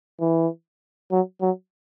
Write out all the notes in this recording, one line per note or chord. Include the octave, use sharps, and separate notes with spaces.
E3
F#3
F#3